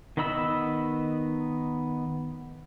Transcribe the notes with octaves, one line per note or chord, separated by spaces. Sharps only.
D#3 B3 D#5 B5 E6